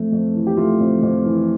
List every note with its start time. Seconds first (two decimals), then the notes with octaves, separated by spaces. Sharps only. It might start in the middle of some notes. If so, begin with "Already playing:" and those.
Already playing: F2 A3 A4
0.12 F2
0.35 E3
0.47 G4
0.57 A3 F4
0.80 F2
1.03 F2
1.26 E3